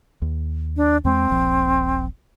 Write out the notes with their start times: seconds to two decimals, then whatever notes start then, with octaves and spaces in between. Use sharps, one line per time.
0.22 D#2
0.77 D4
1.04 E2 G#3 C4
1.30 D#1 A#1 F3